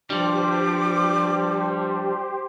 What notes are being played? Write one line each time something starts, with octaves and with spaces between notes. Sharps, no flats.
G2 F3 G3 G4 C5 D6